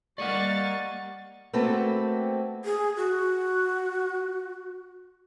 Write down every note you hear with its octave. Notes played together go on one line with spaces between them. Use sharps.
G3 A#3 D5 D#5 F#5 C#6 A6
A3 A#3 C4 F#4 A4 B4
G#4
F#4